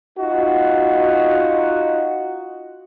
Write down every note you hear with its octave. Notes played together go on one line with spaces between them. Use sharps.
D#4 F4 F#4